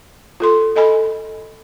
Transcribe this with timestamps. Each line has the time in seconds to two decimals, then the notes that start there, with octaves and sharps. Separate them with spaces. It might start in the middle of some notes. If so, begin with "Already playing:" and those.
0.40 F4 A4 C6
0.76 A4 D#5 G#5 B5